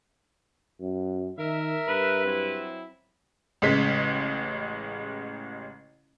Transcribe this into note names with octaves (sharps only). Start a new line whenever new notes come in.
F#2
D#3 A#4 E5
G2 B4
F#3 C4 E4
A1 C#3 G#3 B6